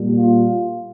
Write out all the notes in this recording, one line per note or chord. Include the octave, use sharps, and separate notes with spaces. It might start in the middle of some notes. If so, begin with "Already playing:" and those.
Already playing: A#2 G3 A#3
F4